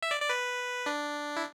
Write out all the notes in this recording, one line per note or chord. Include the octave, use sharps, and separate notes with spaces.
E5
D5
D5
B4
D4
E4